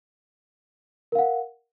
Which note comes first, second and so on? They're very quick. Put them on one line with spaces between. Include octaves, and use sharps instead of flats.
A#4 F5 F#5